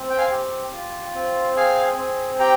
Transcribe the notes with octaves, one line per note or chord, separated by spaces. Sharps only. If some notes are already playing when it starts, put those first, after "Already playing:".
Already playing: C4
G5
F5 G#5
G4
F4
C4
G#4 F5 G#5
C4
G4 G5 A#5